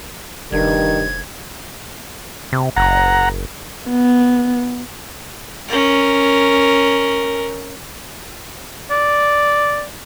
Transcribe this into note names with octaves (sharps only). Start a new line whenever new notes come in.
F1 G2 D#3 G#6
C3
F#1 F#5 A#5
B3
C#4 A#4
D5